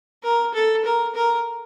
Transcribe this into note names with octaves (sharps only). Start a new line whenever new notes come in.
A#4
A4
A#4
A#4